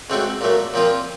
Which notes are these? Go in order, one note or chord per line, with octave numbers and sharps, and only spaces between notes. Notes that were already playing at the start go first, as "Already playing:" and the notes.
C#2 C#3 A3 C4 F#4
A#2 F#3 A3
A#2 F3 C4 F4